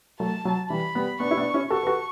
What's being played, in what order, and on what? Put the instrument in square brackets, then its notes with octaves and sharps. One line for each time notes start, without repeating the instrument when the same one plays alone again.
[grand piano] F#3 A3 [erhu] A5
[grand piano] F#3
[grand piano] E3 G3 [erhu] B5
[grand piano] G3 B3
[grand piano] B3 D4 [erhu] C#6
[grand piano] E4
B3 D4
C#4 E4
[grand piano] F#4 A4 [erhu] C#6
[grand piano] B4
F#4 A4